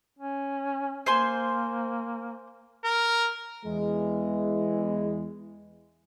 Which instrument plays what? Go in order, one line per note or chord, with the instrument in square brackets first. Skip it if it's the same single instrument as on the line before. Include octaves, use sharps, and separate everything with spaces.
[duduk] C#4
[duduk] A#3 [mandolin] C5 G#5 C6
[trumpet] A#4
[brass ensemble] E2 E3 G#3